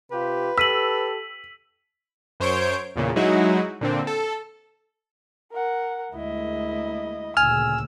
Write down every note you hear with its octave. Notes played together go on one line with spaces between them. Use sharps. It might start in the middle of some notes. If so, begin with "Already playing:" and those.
C3 F4 G4 B4
G4 A4 E6 B6 D#7 F#7
F#2 C5 C#5 G6 D7
E2 A#2 C#3
F#3 G#3 D#4 E4 F#4
A#2 D3 C4
A4
A#4 F#5
D2 G#3 A#3 E4 D#5
D2 A#2 C#3 G#5 E6 F6